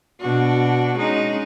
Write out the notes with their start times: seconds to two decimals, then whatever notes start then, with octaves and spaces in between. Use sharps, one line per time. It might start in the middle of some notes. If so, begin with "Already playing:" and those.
0.20 B2 D4 F#4
0.97 G#3 C#4 D#4